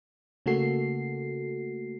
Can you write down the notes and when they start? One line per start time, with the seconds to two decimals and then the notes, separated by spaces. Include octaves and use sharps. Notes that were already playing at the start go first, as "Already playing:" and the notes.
0.46 C#3 A3 A#3 F#4 A4 C7